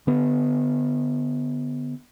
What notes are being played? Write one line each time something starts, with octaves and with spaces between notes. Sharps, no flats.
D3 B3